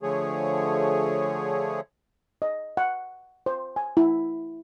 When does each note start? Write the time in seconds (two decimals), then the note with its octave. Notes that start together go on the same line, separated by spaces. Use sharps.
0.03 D3 F3 A3 G#4 C#5
2.42 D#5
2.77 F#5
3.46 C5
3.76 G#5
3.97 E4